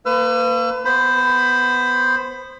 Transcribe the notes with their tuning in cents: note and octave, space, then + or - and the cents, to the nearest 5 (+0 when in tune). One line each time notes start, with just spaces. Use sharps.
A#3 -15 B4 +35 E6 +40
B3 +0 C5 +0 B5 +20